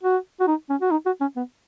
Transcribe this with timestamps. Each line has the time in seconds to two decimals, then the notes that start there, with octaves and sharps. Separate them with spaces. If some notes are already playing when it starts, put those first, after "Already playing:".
0.03 F#4
0.40 F#4
0.47 D#4
0.69 C#4
0.81 F#4
0.91 D#4
1.06 F#4
1.21 C#4
1.36 B3